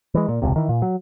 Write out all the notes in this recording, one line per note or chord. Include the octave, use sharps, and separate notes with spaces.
E3 G#3
A#2
E1 C#2 C3
D#3 E3
A#2
F#3